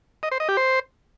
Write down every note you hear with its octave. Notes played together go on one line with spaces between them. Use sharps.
D#5
C5
D#5
G4
C5